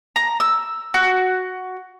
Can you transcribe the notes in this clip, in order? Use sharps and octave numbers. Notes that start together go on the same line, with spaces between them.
A#5
E6
F#4